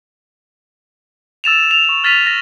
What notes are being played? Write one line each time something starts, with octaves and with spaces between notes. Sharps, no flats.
E6 A6 E7 F7
F7
C#6 F7
F6 A6 B6 D#7 F7 G7
A#6